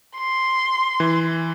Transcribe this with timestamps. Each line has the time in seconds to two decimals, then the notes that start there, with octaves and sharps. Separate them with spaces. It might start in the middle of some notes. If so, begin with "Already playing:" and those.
0.17 C6
1.00 E3